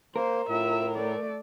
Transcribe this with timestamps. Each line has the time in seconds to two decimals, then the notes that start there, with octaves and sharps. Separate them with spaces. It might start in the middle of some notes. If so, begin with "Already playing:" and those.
0.16 A#3 A#4 C5
0.49 A2 F4 E5
0.95 A3 D5